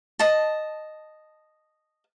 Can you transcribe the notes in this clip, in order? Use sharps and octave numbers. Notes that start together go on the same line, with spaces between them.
D#5 A5